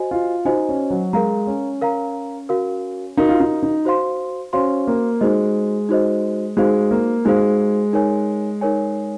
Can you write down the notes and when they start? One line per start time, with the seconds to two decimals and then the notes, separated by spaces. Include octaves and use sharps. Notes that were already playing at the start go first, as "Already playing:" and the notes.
Already playing: F#4 C5 D#5 G#5
0.11 F4
0.45 D#4 F#4 C5 D#5 G#5
0.69 C#4
0.90 F#3
1.13 G#3 A#4 F5 A#5
1.47 C#4
1.82 A#4 F5 A#5
2.49 F#4 A#4 F5
3.17 D#4 F#4 A#4 F5
3.29 F4
3.40 D#4
3.63 D#4
3.85 F#4 C5 F5 C6
4.53 C#4 F#4 C5 F5 C6
4.87 A#3
5.21 G#3 D#4 F#4 C5 D#5
5.89 D#4 F#4 C5 D#5
6.57 G#3 D#4 F#4 C5 F5
6.91 A#3
7.25 G#3 D#4 F#4 C5 F5
7.93 D#4 A#4 C#5 G#5
8.61 D#4 A#4 C#5 G#5